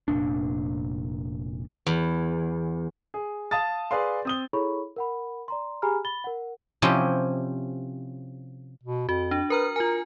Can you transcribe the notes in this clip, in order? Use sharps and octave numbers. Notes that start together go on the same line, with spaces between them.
F1 A#1 A#2 D4
E2
G#4
F5 A5 D#6 A6
G#4 B4 D5 F5 C6
C4 D#6 G7
E4 G#4 A4 C#5 B5 C#6
A#4 F#5 B5
D5 A#5 C6
G4 G#4 G#5 A#5 B5 F6
B5 A6 G7
A#4 F#5
C3 F3 C#4 E4 G4 D#5
B2
F2 F#4
D4
A#4 B4 A#5 F6
F4 A#4 G#5